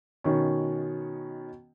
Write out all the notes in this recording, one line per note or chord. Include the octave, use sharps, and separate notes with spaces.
B2 D#3 C#4